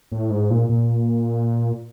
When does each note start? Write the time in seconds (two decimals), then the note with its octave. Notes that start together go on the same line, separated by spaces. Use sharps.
0.12 A2
0.30 G#2
0.50 A#2
0.69 A#2